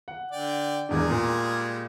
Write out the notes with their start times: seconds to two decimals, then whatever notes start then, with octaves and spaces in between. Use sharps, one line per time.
0.08 F#5
0.32 D3 D5 G5
0.89 E1 E2 G3 G#3 D4 G#4
1.10 A#2